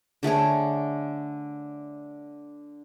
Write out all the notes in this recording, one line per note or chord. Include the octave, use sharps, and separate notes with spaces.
D3 A3 G#4 C#5